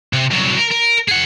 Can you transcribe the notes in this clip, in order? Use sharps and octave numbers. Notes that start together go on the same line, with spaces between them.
C3
C2 F#3
A#4
A#4
G#4 F#5